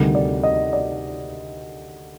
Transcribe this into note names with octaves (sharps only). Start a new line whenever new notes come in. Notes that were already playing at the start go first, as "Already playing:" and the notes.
Already playing: D2 C3 D#3 G3
D5
D#5
D5